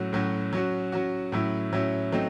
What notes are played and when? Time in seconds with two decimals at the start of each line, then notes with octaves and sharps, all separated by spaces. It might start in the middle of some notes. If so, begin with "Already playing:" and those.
Already playing: A2 F#3 C#4 F#4
0.13 A2 F#3 C#4 F#4
0.53 F#3 C#4 F#4
0.92 F#3 C#4 F#4
1.32 A2 F#3 C#4 E4
1.73 A2 F#3 C#4 E4
2.12 F#3 A3 C4 D#4